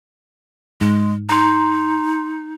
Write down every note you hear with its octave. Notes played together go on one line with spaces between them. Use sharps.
G#2 G#3
D#4 A#5 C6